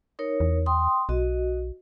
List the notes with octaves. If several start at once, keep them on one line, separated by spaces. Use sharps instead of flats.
D#4 A#4 C#5
E2
G5 C6 D#6
B1 F#4 D#5